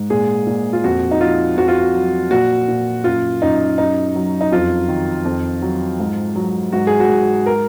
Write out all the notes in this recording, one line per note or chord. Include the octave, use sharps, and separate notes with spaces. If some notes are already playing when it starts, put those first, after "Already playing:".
Already playing: G#2
A#2 G#4
A#2
F4
F2 F#4
D#4
F3 F4
F2 F#4
F4
F#4
F#3
A#2 F#4
A#2
F#2 F4
F#2 D#4
F#2 D#4
F#3
D#4
F2 F4
D#3
F2
F#3
G#2
F#3
G#2 F#4
G#4
F#4
G#2
A#4